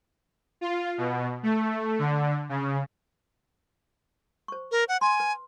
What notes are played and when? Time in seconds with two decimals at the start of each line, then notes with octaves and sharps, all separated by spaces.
0.61 F4
0.98 B2
1.43 A3
1.99 D3
2.49 C#3
4.48 C5 C#6
4.71 A#4
4.89 F#5
5.01 G#5 C6
5.20 B4